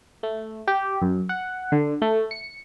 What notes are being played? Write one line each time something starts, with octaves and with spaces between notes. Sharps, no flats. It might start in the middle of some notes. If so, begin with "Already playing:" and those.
A3
G4
F#2
F#5
D3
A3
C#7